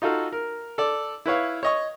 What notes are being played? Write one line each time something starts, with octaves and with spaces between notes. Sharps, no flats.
D#4 F4 F#4 A4 F5
A#4
A4 D5
E4 B4 C#5 F5
C#5 D#5 C#6